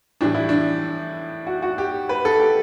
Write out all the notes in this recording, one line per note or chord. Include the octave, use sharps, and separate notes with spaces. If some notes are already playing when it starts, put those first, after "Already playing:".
A2 E3 G3 D4
E4
D4
F#4
F#4
G4
B4
A4
G4